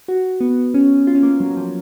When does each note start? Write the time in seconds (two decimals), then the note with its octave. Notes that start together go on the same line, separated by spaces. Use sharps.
0.08 F#4
0.41 B3
0.74 C#4
1.07 F4
1.15 C#4
1.23 A#3
1.40 F#3
1.50 F#3
1.57 F3
1.61 F#3